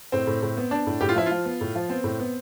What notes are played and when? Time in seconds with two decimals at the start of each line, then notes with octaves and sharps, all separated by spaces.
0.12 A2 C4
0.27 A2
0.43 A2
0.57 B3
0.71 B3 D4
0.87 A2
1.01 A2 G4
1.09 F4
1.16 F3 E4
1.26 F4
1.31 F3
1.45 B3
1.61 A2
1.75 F3
1.89 B3 C4
2.04 A2
2.20 B3